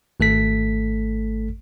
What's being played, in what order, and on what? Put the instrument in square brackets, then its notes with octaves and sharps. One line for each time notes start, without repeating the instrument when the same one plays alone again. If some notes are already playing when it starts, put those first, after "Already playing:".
[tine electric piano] G#1 A3 A4 B6